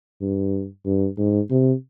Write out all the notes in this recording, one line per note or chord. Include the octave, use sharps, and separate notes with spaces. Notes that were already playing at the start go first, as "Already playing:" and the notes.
G2
G2
G#2
C3